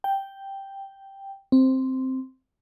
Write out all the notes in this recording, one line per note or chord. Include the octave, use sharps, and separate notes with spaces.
G5
C4